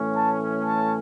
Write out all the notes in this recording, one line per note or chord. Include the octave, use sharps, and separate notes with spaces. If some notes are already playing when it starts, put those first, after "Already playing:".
Already playing: A2 E3 A3 C#4
A5
A5